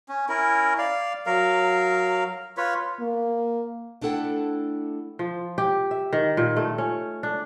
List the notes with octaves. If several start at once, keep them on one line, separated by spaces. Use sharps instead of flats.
C#4
C#4 E4 A#4
D5 F5
F#3 A#4 F5
F4 B4 C#5
A#3
A3 D4 E4 A4 F#5 G5
F3
G4
E5
D#3
A#2
A3
C#4
D4